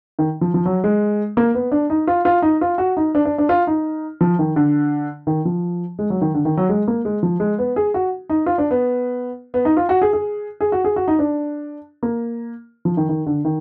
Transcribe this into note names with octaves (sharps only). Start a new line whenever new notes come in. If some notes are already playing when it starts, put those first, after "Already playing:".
D#3
F3
F3
F#3
G#3
A#3
B3
D4
D#4
F4
F4
D#4
F4
F#4
D#4
D4
D4
D4
F4
D#4
F3
D#3
D3
D#3
F3
G#3
F#3
D#3
D3
D#3
F#3
G#3
A#3
G#3
F3
G#3
B3
G#4
F#4
D#4
F4
D4
B3
B3
D#4
F4
F#4
G#4
G#4
G#4
F#4
G#4
F#4
D#4
D4
A#3
F3
D#3
D#3
D3
D#3